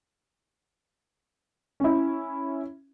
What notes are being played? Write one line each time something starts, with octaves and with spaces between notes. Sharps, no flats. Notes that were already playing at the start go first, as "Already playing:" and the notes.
C#4 E4